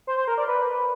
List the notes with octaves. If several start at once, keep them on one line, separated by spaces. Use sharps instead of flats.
C5
C5
A#4
D5
B4